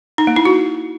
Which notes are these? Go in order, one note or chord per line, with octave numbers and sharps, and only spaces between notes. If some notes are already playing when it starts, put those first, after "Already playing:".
D#4
A#3
E4
F#4